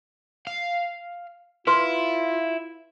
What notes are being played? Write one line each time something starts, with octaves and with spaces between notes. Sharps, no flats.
F5
E4 F4 B4 C6